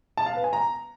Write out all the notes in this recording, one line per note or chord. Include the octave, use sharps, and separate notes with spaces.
A5
F5
B4
G#5
A#5